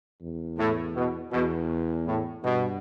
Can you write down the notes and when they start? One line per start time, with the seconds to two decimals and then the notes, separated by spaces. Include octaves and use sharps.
0.22 E2
0.59 A2
0.95 B2
1.32 E2 B2
2.07 A2
2.43 G2 B2